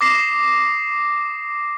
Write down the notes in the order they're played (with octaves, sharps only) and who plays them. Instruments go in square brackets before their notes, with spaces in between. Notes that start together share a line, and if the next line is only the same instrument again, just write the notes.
[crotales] D6 D#6 A#6 C7 E7